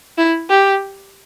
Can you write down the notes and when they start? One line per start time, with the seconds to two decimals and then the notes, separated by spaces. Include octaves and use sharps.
0.18 E4
0.49 G4